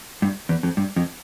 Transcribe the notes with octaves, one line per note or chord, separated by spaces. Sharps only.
G2
E2
F2
G2
F2